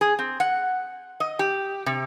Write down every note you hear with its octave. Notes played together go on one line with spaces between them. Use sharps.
G#4
C4
F#5
D#5
G4
C3